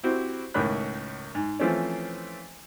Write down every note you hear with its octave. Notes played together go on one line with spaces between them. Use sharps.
C4 E4 F#4 G4
C#2 A2 D#3 C#4 B5 F#6
G#2
E3 F3 A3 C4 C#4